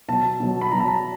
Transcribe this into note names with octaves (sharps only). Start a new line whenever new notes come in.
B2 F#3 A5
B2 F#3
B5
B2 F#3 A#5
A5
A#5